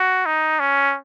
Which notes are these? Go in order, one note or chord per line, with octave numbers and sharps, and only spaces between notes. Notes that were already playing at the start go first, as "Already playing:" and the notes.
Already playing: F#4
D#4
C#4